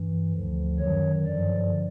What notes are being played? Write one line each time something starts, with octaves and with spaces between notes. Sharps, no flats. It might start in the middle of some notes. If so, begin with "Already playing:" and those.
Already playing: G2 E3
D2 D3 F3
F#2 D#3 F#3 C#5
G2 D3 F3 D5